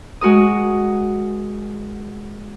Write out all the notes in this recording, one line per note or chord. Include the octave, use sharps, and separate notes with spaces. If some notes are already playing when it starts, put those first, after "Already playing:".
G#3 F#4 A#4 D#6